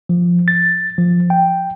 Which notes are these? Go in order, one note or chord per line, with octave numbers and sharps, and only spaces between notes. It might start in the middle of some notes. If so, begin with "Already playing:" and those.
F3
A6
F3
G5